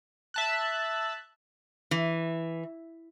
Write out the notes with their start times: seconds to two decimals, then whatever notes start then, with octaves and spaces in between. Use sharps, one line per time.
0.34 E5 A5 F#6
1.91 E3